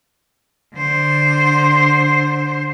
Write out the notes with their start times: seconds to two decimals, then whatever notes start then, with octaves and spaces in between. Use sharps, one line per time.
0.75 D3 C5